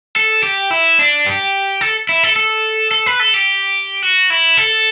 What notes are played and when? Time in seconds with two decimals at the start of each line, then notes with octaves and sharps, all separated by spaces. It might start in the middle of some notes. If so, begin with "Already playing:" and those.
0.16 A4
0.43 G4
0.71 E4
0.99 D4
1.26 G4
1.81 A4
2.09 E4
2.23 A4
2.36 A4
2.91 A4
3.06 B4
3.20 A4
3.34 G4
4.02 F#4
4.30 E4
4.57 A4